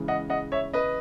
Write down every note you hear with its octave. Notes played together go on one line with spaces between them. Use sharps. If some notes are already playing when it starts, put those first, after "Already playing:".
Already playing: C#3 E3 G#3
D#5 F#5
D#5 F#5
C#5 E5
B4 D#5